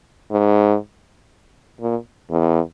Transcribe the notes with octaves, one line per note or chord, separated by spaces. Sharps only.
G#2
A#2
E2